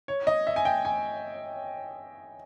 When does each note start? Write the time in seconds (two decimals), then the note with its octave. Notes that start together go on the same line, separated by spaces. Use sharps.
0.08 C#5
0.27 D#5
0.47 E5
0.56 G#5
0.65 G5
0.85 G#5